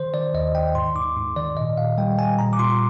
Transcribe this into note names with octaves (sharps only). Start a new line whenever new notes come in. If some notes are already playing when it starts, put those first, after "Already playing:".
Already playing: D#3 C5
D#3 D5
D#2 D#5
D#2 G5
G#2 C6
G#2 D6
G#2
D#3 D5
A#2 D#5
A#2 F5
G3 G5
G3 G#5
A#2 A#5
D6
A#2 C6